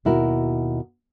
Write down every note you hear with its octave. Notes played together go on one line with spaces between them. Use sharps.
D#2 B2 E4 F#4 A#4